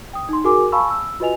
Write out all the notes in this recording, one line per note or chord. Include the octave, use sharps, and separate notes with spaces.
G5 D#6
D#4 C6
F#4 G#4 A#4 G#5 D6
F5 G#5 A5 B5 C#6 E6
E6
F4 F#4 B4 D#5 G#5 F7